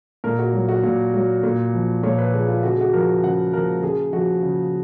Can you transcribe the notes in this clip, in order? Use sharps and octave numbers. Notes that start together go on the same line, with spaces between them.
A#2 A#4
F#4
F#3
F#4
A#2
F#3
A#2
F3
A#2 C#5
B4
F3 G#4
F4
C#3 F#4
G#4
F#4
F3 A#4
C#3 F#5
F3 A#4
C#3 G#4
F3 F#4
C#3